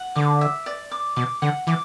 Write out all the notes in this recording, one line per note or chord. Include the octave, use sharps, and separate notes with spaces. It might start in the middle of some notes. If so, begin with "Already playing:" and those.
Already playing: F#5
D3 D6
E5
D5
D6
B2 D6
D3 F#5
E3 D6